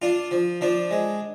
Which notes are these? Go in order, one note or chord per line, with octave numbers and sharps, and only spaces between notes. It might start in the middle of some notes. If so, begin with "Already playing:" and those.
D4 F4
F3
F3 D4
G#3